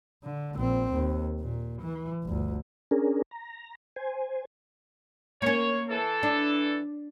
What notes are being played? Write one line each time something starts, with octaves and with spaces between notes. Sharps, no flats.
D3
A#1 C4
D#2
A#2
E3
G1 D2
C#4 D4 G#4 A#4
A#5
C5 G#5
A#3 C#4 C#5
E3 A4
D4